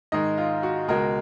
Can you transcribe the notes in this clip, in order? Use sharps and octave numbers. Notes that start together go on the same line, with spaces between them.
G#2 D#3 G#3 D#5
F4
F#4
C#2 B2 G#3 A#4